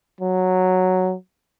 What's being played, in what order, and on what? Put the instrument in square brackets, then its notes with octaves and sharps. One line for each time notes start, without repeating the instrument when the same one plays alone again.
[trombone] F#3